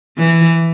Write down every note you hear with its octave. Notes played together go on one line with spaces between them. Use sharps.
E3